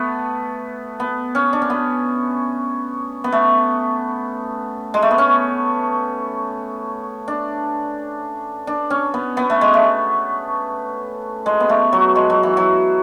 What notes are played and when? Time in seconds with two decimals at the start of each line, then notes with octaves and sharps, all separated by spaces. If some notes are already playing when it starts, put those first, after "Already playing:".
Already playing: A3 B3
1.00 B3
1.35 C#4
1.53 D4
1.62 C#4
1.70 B3
3.24 B3
3.32 A3
4.94 G#3
5.02 A3
5.11 B3
5.18 C#4
7.28 D4
8.67 D4
8.90 C#4
9.14 B3
9.37 B3
9.50 A3
9.61 G#3
9.74 A3
11.46 G#3
11.60 B3
11.69 A3
11.93 F#3
12.16 G#3
12.30 F#3
12.43 E3
12.57 F#3